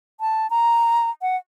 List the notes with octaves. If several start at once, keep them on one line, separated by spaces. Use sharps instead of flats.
A5
A#5
F#5